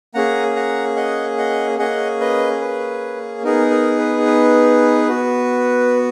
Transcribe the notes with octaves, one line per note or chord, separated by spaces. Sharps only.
A#3 C#4 G#4 F#5 A#5
F#5 A#5
D#5 F#5
D#5 F#5
A#3 C#4 G#4 D#5 F#5
B4 D#5
B4
B3 D#4 G#4 A#4
A#4
B4
B4
B3 F#4